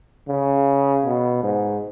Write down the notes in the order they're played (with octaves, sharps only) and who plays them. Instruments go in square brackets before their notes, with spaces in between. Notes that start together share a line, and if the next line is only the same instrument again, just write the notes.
[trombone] C#3
B2
G#2